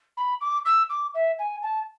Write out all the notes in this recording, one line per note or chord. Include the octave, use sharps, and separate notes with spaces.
B5
D6
E6
D6
E5
G#5
A5